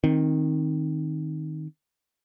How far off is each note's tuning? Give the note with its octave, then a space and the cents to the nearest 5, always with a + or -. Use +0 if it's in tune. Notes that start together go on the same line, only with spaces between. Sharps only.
D#3 +0 C4 +15